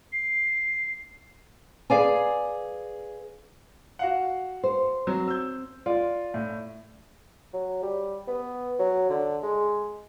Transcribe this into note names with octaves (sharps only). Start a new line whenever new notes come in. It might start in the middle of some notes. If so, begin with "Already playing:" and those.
C7
G#4 B4 D5 F5 G#5
F#4 F5 F#5
C5
F#3 C4
E6 G6
F4 D5
A2
F#3
G3
B3
F#3
D3
G#3